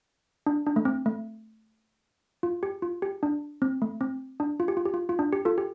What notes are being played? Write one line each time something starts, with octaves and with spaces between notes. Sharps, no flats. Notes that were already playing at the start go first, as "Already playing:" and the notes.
D4
D4
A3
C4
A3
F4
G4
F4
G4
D4
C4
A3
C4
D4
F4
G4
F4
G4
F4
F4
D4
G4
F4 A4
G4